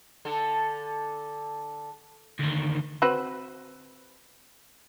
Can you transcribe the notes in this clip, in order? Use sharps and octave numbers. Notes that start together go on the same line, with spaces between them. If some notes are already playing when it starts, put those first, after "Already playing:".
D3 A4
D2 D#3
C4 F#4 B4